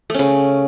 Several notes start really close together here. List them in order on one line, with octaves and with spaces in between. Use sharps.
A3 C#4 C#3